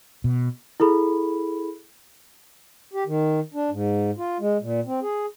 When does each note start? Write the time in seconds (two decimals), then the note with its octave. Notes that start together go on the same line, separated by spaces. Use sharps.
0.24 B2
0.80 E4 G#4 A4 B5
2.93 G4
3.07 D#3
3.54 D4
3.71 G#2
4.18 F4
4.40 G#3
4.61 A#2
4.86 C4
5.02 G#4